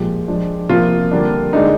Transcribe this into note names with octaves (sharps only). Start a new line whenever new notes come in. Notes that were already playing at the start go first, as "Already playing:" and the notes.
Already playing: A#2 F3 G#3 G4
F3 G#3 D4
C3 F3 A#3 F4
D3 G3 A#3 D4
D3 G#3 D4 D#4